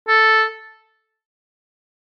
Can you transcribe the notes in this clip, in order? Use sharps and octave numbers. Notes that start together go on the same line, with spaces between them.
A4